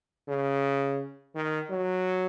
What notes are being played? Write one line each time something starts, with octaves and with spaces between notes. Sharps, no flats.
C#3
D#3
F#3